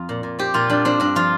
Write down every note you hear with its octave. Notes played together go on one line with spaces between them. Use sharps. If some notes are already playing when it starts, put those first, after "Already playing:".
Already playing: F2 F4
A#2
A#2
C4 G4
A#2 F4
G3 D4
C4 D4
G2 D4
F3 F4